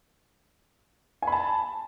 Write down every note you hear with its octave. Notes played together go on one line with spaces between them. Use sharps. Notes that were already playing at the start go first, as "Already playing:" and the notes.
G#5 A5 B5